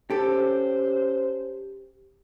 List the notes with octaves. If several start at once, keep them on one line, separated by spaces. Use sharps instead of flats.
C#4 G4 A4 C5